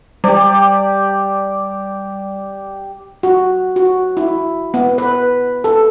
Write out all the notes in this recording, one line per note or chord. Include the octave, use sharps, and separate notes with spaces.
G3 G4 D5
F#4
F#4
E4
B3
B4
A4